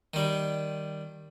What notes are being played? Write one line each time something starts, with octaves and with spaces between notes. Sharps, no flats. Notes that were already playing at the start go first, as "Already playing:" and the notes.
D#3 G3